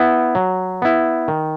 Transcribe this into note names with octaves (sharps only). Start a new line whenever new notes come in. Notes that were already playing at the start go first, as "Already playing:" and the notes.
Already playing: B3 E4
F#3
B3 E4
D#3